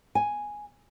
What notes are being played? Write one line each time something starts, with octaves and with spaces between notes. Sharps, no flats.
G#5